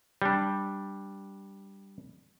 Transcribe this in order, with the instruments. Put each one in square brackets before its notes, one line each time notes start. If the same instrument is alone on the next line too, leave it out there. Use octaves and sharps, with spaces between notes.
[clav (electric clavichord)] G3 D4